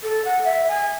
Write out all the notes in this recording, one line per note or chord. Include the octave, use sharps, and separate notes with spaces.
A4
F#5
E5
G#5